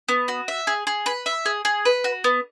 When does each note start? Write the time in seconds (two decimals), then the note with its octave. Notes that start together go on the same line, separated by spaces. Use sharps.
0.09 B3
0.28 F#4
0.48 E5
0.67 G#4
0.87 G#4
1.06 B4
1.26 E5
1.46 G#4
1.65 G#4
1.85 B4
2.04 F#4
2.24 B3